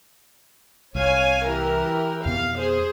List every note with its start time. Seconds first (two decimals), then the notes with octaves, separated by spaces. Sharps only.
0.95 C2 C#5 F5 G#5
1.45 E3 G4 A#4
2.26 F2 B2 B3 F5
2.58 G#4 C5